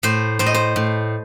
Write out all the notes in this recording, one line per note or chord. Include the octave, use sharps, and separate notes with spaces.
A2 C5
A2 C5
D#5
C5
A2